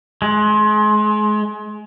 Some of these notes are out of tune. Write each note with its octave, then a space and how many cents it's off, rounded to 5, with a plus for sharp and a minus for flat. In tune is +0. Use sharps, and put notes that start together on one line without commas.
G#3 +30